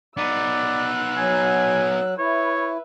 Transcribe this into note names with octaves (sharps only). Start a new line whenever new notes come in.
B3 D#4 D5 E6 F#6
F#3 G#5
E4 B4 C#5 E5